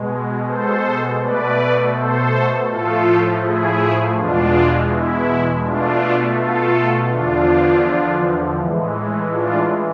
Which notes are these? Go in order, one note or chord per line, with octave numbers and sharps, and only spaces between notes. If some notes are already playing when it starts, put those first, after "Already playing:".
Already playing: B2 G#3
A4 C5
B2 A3 B4 D5
A4 C5
A2 F3 A3 F4 A4
E4 G#4
E2 B2 G#3 D4 F4
E4
B2 A3 D4 F4
F4 A4
E2 D3 F3 D4 F4
A2 E3 G#3
D4 F4